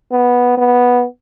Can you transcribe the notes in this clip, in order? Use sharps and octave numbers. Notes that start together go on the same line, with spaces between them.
B3
B3